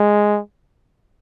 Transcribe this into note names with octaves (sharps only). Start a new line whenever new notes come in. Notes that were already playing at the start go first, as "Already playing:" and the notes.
Already playing: G#3